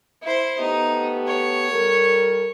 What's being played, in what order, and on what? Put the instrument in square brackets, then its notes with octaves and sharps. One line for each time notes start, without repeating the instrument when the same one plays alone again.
[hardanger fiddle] E4 C5
[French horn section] A3 B3 G4 [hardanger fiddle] D#4
[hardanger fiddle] C#5
[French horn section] G3 A4 A#4